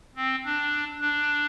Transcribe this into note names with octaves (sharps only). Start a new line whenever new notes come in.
C4
D4
D4